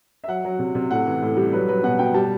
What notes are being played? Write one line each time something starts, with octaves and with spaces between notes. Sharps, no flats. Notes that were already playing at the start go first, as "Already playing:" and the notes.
E5
F#3 F#5
F#3
C3
C3
A2 F#5
E3
A2
G3
F#3 B4
F#3 B4
B2 F#5
B2 G5
G3 A5